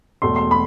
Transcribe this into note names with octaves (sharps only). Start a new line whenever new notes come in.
E1 E2 B2 A3 C6
C6
B5